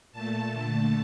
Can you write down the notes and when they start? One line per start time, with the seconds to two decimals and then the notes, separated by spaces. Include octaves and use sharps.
0.12 A#2 A3 A5
0.53 D3 A3